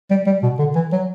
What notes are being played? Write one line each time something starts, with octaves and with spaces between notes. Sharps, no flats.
G3
G3
B2
D3
E3
F#3